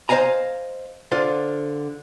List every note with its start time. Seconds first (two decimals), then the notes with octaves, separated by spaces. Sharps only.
0.09 C5 D#5 F5 G#5 A#5
1.12 D3 F4 C5